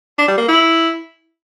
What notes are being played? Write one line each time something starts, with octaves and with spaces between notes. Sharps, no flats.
D4
G3
A#3
E4